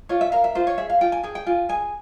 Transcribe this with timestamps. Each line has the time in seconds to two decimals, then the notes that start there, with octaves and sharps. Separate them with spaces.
0.09 F4 C#5
0.21 E5
0.32 A#4 F5
0.44 E5
0.55 F4 C5
0.67 C#5
0.78 G#4 E5
0.90 F5
1.01 F4 G5
1.12 G#5
1.23 G#4 G5
1.35 G5
1.46 F4 G#5
1.69 G#4 G#5